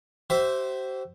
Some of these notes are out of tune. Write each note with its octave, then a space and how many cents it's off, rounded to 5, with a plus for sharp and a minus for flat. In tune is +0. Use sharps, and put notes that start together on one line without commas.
G4 -45 C5 +0 E5 +5